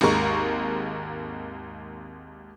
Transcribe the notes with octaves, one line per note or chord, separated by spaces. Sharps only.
G#1 D#2 G#3 A#4 C#6